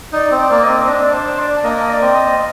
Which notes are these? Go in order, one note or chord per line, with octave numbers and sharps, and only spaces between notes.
D#4 D5
C4
D5
A#3
D#5
C4
C4
D4 D5
C5
D5
A#3 D#5
D5
C4
D#5